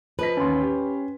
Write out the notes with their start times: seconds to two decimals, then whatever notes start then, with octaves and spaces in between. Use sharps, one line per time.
0.19 F3 B4 D#5 B6
0.37 A1 D#2 C#4 C6
0.61 G4